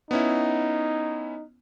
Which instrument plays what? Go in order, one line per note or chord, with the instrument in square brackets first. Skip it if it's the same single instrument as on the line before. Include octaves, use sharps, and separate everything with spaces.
[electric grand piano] B3 C#4 E4 [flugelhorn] D#4